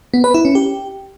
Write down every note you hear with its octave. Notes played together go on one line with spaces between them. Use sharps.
B3
B4
E4
C#4
G4